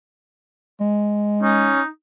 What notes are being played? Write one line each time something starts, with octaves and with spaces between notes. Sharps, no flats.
G#3
C#4 D#4